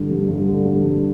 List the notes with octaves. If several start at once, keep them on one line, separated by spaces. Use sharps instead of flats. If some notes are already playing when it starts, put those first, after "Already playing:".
Already playing: G2 D3
G3
G2
D3
G2
G3